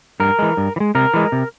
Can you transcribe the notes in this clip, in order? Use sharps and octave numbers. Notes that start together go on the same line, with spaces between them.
G2 A#4
E3 G#3
G2
E3
G#3
C3 A#4
E3 G#3
C3